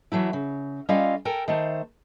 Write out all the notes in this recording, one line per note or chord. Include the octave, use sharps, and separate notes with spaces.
E3 F#3 A3 E4
C#3
G3 C#4 F4 A4 D#5 F5
A4 A#4 G5 G#5
D#3 A3 C5